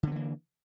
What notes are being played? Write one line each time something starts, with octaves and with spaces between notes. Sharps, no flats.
D3 E3 A#3 B3